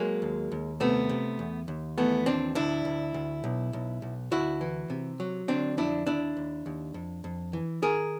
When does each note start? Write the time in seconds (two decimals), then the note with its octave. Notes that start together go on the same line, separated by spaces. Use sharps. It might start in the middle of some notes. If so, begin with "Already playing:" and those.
Already playing: F#3 G#3 A#3
0.22 D#2
0.52 D#2
0.80 C3 A3 B3
1.09 C3
1.39 E2
1.68 D#2
1.98 E3 A3 B3
2.26 D#2 C4 D4
2.55 D2 D4 E4
2.85 D2
3.14 D2
3.44 B1
3.73 B1
4.02 B1
4.31 D2 E4 F#4
4.61 E3
4.90 C3
5.20 F#3
5.48 D3 C4 D4
5.77 F2 D4 E4
6.07 D#2 D4 E4
6.37 D#2
6.66 D#2
6.94 F2
7.24 F2
7.53 E3
7.82 D#3 G#4 A#4